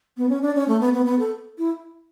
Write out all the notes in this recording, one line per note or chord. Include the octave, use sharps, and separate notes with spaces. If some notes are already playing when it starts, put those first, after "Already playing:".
B3
C#4
D4
C#4
A3
B3
B3
B3
A4
E4